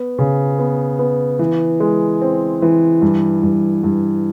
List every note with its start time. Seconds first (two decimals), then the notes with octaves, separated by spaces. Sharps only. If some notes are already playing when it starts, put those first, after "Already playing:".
Already playing: B3
0.19 C#3
0.59 B3
0.99 B3
1.39 E3
1.80 G#3
2.21 C4
2.62 E3
3.02 G2
3.43 G2
3.83 G2